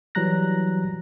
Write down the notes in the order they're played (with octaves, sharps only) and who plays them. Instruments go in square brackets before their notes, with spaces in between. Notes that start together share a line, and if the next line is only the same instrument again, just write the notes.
[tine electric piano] E3 F#3 G3 A#5 F#6 A#6